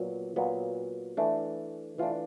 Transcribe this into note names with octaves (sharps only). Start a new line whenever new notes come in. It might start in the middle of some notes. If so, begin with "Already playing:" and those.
Already playing: A#2 F#3 B3
A#2 F#3 B3
E3 A3 D4
E3 A3 D4 F4